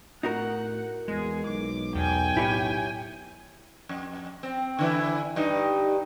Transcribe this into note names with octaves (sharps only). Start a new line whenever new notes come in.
A2 D#4 F#4 A#4 F#5
E2 G#3 G#4
B1 D6
E2 G5 G#5
A2 E4 G4 C#5
F2
C4
D3 E3 E4
G2 D#4